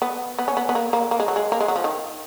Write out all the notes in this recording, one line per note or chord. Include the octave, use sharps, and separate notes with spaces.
B3
B3
C#4
B3
B3
A#3
A#3
A#3
G#3
F#3
G#3
A#3
G#3
F#3
F3
D#3